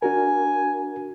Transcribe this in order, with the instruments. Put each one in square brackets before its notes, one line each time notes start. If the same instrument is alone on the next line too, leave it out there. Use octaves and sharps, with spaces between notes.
[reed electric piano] D4 F#4 A#4 [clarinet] G#5